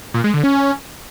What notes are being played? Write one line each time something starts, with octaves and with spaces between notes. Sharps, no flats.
A#2
G#3
D3
C#4